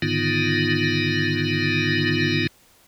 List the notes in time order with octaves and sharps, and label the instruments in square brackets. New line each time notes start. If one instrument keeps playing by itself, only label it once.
[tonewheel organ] G#2 D3 D#3 B3 D#4 F4